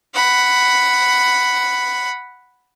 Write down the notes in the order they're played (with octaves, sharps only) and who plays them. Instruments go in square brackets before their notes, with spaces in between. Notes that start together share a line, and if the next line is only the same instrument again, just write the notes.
[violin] F#5 B5